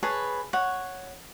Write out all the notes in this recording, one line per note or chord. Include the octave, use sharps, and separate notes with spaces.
G#4 B4 C#5 A5
C#5 F#5